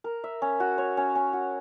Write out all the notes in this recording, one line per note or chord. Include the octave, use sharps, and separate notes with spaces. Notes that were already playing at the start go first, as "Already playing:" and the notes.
A#4
E5
C#4
F#4
C#5
C#4
C#4
F#4